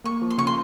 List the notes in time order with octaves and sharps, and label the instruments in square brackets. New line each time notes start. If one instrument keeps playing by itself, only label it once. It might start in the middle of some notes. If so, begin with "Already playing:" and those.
[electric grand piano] A#3 [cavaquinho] C#6
[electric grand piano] F3
[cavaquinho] C6
[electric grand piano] C#3 [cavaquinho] C#6
[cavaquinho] C6